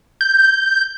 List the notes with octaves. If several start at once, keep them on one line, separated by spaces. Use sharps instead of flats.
G6